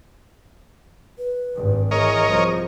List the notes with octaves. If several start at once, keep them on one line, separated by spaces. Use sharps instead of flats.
B4
G#1 G2
E3 G#4 A#4 C#5 D#5
C2 F3